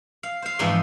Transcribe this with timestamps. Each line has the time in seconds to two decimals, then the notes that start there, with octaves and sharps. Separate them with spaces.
0.23 F5
0.42 C5 F5
0.59 F2 G#2 E3 F4 G#4 C6